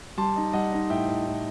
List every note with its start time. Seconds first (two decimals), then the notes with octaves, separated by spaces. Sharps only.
0.17 G3 A5 C6
0.36 D#4
0.53 G3 D#5 F#5
0.72 D#4
0.90 A2 E5 G5
1.08 A2
1.27 A2